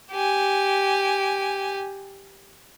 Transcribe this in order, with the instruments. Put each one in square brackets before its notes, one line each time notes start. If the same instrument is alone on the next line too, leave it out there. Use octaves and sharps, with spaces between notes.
[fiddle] G4 G#5